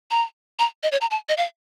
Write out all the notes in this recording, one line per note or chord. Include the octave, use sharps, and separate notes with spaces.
A#5
A#5
D#5
C#5
A#5
A5
D#5
F5